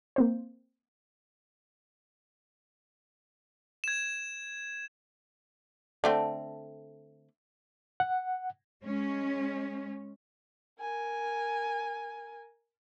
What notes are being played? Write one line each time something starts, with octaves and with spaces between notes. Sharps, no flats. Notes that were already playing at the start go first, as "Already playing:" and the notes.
A#3 C4 C5
G#6 E7
D3 A3 C4
F#5
G#3 C#4
A#4 G#5